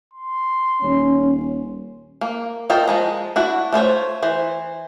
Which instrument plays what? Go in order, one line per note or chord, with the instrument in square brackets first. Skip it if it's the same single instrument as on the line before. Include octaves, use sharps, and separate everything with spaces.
[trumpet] C6
[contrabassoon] D#1 [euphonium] C#4
[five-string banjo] A#3
F4 A4 A#4 D#5 G5
F3 G#3 A#5
D4 E4 F#4
A3 F4 C5 C#5
E3 C5